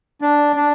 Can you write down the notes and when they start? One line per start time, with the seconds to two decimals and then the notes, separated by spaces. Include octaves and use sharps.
0.21 D4
0.56 D4